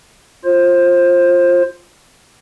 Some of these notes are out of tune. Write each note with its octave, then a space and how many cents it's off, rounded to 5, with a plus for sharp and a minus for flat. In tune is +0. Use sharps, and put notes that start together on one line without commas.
F4 +0 C5 +25